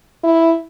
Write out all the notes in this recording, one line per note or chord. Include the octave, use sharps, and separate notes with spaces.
E4